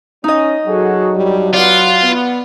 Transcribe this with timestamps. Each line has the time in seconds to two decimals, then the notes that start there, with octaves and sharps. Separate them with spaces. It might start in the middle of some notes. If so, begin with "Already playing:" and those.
0.24 C#4 D#4 D#5
0.67 F#3 F#4 G#4 A4
1.15 G2 G3
1.53 B3 F4 D5 F#5
2.03 B3